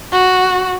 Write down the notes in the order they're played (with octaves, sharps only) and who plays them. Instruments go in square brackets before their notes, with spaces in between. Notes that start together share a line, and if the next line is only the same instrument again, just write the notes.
[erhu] F#4